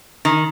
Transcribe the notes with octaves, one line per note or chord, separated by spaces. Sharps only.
D#3